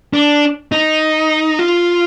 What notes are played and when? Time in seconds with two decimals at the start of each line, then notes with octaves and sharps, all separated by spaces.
0.14 D4
0.72 D#4
1.59 F4